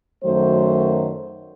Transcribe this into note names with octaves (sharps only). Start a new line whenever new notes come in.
F#2 D#3 F#3 A3 C5